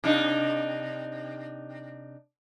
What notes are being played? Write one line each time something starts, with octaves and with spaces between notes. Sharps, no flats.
C3 D4 D#4